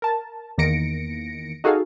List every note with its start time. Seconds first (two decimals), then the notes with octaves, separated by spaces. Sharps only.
0.02 A#4 A5
0.58 E2 D#3 A#3 A#6 C#7 D7
1.64 D#4 F#4 G#4 A4 F5